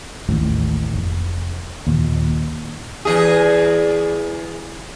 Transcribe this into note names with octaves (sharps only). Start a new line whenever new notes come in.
A1 D#2 A2
F1
D#2 A#2
E2 G#4